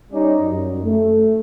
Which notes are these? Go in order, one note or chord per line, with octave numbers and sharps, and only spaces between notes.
G3 C#4 D#4 D5
F#2
A3